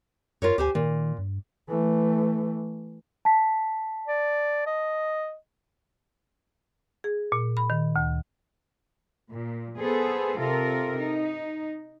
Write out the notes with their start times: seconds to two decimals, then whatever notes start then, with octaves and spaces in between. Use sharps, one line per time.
0.42 F#2 F4 A#4 C#5
0.58 D2 G4 C5 G#5
0.75 A#2 D#3
1.18 G2
1.69 E3 A3
3.25 A5 B6
4.08 D5
4.67 D#5
7.04 G#4
7.32 A#2
7.57 B5
7.70 D#3
7.96 D2
9.29 A#2
9.78 B3 G#4 A4 C5
10.38 C3 F4 A4 A#4
10.96 D#4